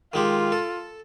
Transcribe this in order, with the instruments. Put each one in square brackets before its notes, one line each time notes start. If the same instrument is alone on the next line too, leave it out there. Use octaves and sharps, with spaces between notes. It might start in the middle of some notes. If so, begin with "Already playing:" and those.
[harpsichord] D#3 G#3 G4 [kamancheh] F4
[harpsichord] A4